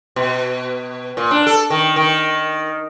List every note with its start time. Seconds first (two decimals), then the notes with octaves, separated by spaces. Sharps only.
0.16 B2
1.17 A#2
1.31 D4
1.47 A4
1.70 D#3
1.96 D#3